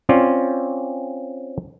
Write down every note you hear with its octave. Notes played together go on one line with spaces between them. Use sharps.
C4 C#4 F4 D5